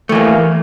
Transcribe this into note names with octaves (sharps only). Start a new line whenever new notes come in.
E3 A3 A#3